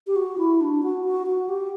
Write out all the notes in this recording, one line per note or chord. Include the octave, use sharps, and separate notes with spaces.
G4
F#4
E4
D4
F#4
F#4
F#4
G4